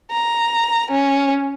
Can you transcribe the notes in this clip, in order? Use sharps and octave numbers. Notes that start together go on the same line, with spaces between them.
A#5
C#4